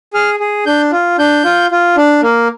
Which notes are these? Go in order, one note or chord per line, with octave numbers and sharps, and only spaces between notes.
G#4 F6
G#4
D4 G6
F4
D4 G6
F4
F4
D4
A#3